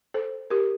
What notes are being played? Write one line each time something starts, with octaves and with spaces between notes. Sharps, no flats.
A4 C5
G4 A#4